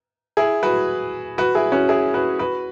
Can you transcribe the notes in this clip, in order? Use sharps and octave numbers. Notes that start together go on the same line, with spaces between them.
E4 G#4
F#4 B4
F#4 B4
E4 G#4
C#4 F#4
E4 G#4
F#4 B4
F#4 B4